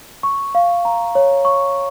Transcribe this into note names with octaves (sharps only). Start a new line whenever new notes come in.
C#6
F5
A#5
C#5
C#6